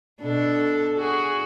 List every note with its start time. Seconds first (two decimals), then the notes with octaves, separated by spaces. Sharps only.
0.21 B2 D4 A4
0.98 F#4 G#4